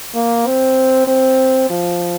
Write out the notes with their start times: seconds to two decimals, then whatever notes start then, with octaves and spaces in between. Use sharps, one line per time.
0.15 A#3
0.46 C4
1.07 C4
1.70 F3